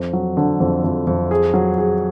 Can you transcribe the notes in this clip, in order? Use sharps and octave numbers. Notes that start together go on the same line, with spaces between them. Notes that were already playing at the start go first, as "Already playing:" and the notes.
Already playing: F2
F#3
D3
F2
F2
F2
G#4
F#3
G#4